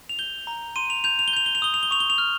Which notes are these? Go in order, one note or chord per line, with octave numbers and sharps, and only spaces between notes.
F7
G6 G7
A#5
C6 D#7
F7
G6 F7
F7
G7
G6 F7
G7
F7
D#6 G7
F7
G7
C#6 F7
G7
F7
F6